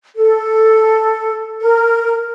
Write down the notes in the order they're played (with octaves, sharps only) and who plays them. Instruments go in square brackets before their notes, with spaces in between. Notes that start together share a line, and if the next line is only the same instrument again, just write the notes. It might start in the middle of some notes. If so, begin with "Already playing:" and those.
[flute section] A4
A#4